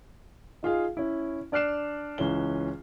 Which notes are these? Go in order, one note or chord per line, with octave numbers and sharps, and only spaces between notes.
D#4 F4 G#4 F5
C#4 E4
D4 D5 F6 F#6 C7 E7
C#2 E3 C#4 G7